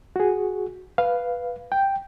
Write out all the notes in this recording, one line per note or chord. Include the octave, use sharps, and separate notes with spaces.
F#4 G#4
B4 F5
G5